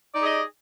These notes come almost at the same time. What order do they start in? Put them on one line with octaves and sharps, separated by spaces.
D5 D#4 G#4 G4 D#5